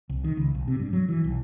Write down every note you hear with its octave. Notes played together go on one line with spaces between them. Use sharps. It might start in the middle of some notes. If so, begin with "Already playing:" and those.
C2
D#3
C#2
B1
C3
G2
F#3
E3
B1